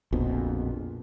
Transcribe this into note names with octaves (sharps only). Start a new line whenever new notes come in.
A#1 F2 B2